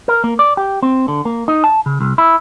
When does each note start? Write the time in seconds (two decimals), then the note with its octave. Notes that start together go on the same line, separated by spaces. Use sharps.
0.08 A#4
0.24 A#3
0.39 D5
0.57 G4
0.83 C4
1.08 D3
1.25 A#3
1.48 D#4
1.64 A5
1.86 C#3
2.01 C2
2.18 E4